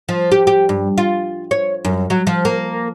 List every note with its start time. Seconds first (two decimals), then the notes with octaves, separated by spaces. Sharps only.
0.09 F3
0.31 G4
0.47 G4
0.69 G2
0.98 F4
1.51 C#5
1.85 F#2
2.10 F#3
2.27 F3
2.45 A#3